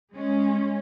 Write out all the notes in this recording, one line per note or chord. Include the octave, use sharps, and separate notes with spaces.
G#3 C#4